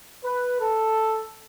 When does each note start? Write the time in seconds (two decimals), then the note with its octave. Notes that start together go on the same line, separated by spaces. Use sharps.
0.23 B4
0.59 A4